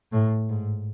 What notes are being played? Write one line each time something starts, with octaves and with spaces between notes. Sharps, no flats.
A2
G#2